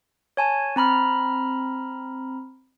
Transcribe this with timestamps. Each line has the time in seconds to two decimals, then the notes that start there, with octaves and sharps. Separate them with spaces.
0.37 C#5 G#5 A5
0.76 C4 A#5 B5 F6